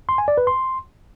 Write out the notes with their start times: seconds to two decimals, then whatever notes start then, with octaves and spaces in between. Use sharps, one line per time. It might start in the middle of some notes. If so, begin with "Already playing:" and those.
0.09 C6
0.18 G#5
0.28 D5
0.38 B4
0.47 C6